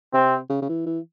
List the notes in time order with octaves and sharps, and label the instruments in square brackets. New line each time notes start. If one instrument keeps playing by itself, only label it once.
[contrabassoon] C3 [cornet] C4
[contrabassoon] C#3
C#3
E3
E3